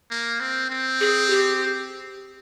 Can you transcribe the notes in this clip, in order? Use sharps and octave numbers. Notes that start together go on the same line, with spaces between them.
A#3
C4
C4
G#4
G4